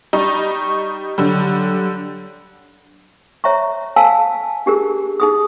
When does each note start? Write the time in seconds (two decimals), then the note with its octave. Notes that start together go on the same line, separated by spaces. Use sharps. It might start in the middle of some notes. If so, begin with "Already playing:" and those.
0.13 G3 D#4 C#6
1.18 D3 F#3 G3
3.44 C#5 E5 A#5 C#6
3.96 F5 F#5 G#5 A5 E6
4.66 D4 G4 G#4 A#4
5.20 D#4 G#4 D#6